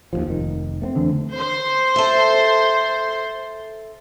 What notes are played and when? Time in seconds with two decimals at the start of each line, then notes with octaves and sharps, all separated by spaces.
0.13 D#2 C3 F3
0.28 F1 D#3
0.82 A3 B3 C4
0.96 E2 D3
1.37 C5 C6
1.96 A4 E5